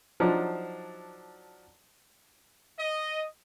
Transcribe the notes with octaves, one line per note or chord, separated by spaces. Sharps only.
F3 F#3 D4 D#4 A#5 D6
D#5